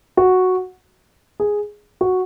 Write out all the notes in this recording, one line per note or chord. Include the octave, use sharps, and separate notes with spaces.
F#4
G#4
F#4